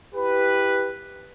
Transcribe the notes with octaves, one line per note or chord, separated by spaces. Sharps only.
E4 G4 B4